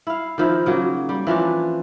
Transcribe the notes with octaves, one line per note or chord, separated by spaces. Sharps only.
E4 F5
D#3 F3 E4
C#3 F#3 A#3
G3
E3 F3 C#4 D4